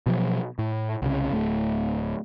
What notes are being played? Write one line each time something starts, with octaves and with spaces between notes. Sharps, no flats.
B2 F3 F#3
A2
C2 C#3
D1 A3